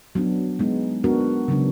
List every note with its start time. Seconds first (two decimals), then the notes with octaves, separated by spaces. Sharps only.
0.15 F#3 B3 D4
0.59 G#3 B3 D#4
1.04 G#3 B3 D4 F#4 A#4
1.48 C#3 F#3 B3 D4